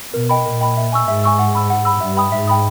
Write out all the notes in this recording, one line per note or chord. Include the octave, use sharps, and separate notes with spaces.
B2 A#4
D#5 G5 B5
A#2 A#4
D#5 G5 B5
E5
G#5 C#6 E6
G#2 E5
G#5 C#6 E6
F#5
B5 E6
F#5
B5 E6
G2 E5
G5 B5 D#6
G#2 E5
G5 B5 D#6